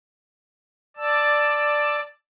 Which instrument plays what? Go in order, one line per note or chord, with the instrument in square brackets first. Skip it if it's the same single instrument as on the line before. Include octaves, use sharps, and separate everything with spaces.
[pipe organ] D5 A5 E6